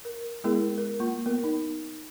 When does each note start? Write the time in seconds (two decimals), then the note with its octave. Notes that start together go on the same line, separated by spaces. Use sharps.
0.05 A#4
0.44 G#3 B3 E4 G#4 A#4
0.78 A#4
1.00 A#3 F4
1.26 B3 A#4
1.44 D#4